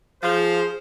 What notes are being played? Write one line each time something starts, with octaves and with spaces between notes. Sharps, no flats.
F3 G#4 C5